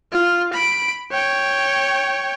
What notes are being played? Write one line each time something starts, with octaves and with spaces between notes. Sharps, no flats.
F4
B5 D7
C#5 G5